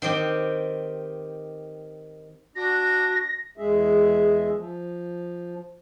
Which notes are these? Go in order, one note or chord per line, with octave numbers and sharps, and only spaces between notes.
D#3 C4 G4
D4 F#4 A#6
E2 G#3 G#4 E5
F3